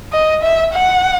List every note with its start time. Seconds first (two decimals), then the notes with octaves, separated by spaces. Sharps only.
0.13 D#5
0.42 E5
0.73 F#5